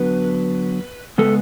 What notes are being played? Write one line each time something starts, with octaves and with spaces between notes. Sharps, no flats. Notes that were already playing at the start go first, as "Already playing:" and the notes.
Already playing: D3 F#3 B3 B4
C#3 G#3 B3 A4